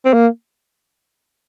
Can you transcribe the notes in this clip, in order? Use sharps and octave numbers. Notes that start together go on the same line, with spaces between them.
C4
A#3